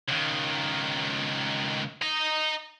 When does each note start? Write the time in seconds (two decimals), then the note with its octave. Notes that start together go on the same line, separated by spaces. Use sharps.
0.08 C#2 D#3
2.01 D#5 A#5